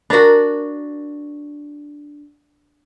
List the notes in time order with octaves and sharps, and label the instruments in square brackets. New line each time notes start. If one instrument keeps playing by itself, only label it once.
[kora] D4 F#4 [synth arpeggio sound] A#4 A#5